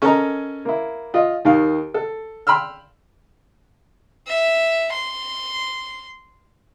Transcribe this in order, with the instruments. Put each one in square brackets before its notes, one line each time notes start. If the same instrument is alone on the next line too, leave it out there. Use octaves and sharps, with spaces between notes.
[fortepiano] C#4 A4 A#4 D#5 G#5 A#5
A#3 E4
F4 D#5
D#2 D#3 F5
A4
G5 B5 C6 E6 F6
[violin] E5
C6